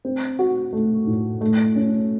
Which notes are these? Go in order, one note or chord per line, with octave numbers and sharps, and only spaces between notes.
C4
F#4
A3
A2
A3
C#4